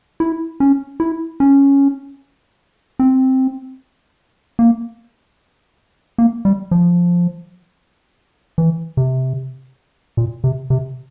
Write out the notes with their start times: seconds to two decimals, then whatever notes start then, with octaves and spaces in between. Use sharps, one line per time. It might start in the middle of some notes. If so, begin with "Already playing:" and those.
0.20 E4
0.60 C#4
1.00 E4
1.40 C#4
2.99 C4
4.59 A#3
6.18 A#3
6.45 G3
6.71 F3
8.58 E3
8.97 C3
10.17 A#2
10.44 C3
10.70 C3